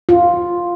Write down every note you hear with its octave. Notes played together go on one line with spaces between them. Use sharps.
F4